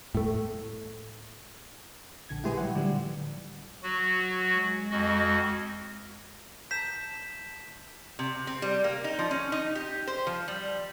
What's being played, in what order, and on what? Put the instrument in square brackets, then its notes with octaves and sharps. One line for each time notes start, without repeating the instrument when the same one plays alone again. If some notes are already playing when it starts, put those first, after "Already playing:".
[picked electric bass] A2 A3
[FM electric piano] A#1 D3 G#6
[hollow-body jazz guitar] A#2 G#3 G#4 [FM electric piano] E4 G4 B4
[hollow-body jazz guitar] F#3 F#5
[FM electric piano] A2 F3 G3 [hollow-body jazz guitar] D3
[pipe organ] F#3 F#4
[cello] G#3
[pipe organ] F2 F#4 D#5
[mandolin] A5 A#5 [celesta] G6 [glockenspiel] B6 E7
[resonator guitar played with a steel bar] C3
C4
G3
A#3
D#4
F3
C#4
D#4
G4
C5
F3
G3